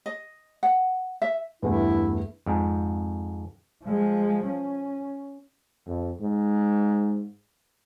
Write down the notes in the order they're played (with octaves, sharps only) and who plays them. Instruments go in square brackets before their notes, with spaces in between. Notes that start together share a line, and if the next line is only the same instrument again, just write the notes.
[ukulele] D#5
F#5
E5
[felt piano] E2 G2 A3 [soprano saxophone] E4
[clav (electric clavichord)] F2 G#2
[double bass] F3 G#3
C#4
[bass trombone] F2
G#2